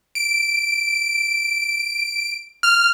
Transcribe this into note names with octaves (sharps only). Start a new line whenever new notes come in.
D7
F6